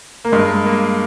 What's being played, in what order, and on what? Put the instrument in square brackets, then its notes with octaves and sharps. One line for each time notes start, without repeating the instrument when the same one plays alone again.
[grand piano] A#3
[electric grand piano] G2 [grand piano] G#3
[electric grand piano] A#3